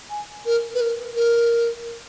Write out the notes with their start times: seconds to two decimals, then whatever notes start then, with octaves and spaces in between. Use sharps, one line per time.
0.10 G#5
0.46 A#4
0.74 B4
0.81 A#4
1.16 A#4